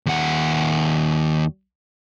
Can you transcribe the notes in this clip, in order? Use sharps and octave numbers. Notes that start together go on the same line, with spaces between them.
D#2 F#5